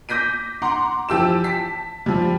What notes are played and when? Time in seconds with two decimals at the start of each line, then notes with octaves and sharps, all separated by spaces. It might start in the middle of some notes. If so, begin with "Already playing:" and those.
0.09 D6 G6 A#6 B6 D#7
0.62 F#5 A#5 C6 D6
1.09 E3 F3 G4 E6 E7
1.44 A5 B6
2.06 F3 G3